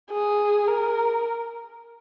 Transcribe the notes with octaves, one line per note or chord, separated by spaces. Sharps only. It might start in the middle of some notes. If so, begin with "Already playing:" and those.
G#4
A#4